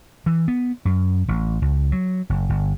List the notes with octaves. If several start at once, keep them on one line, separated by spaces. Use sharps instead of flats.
E3
B3
F#2
A1
C#2
F#3
F#1
G1